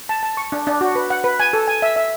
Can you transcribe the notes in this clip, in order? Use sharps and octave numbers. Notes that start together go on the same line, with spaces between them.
A5
A5
C#6
D4
D4
F#4
B4
F#5
B4
G#5
A4
G#5
E5
E5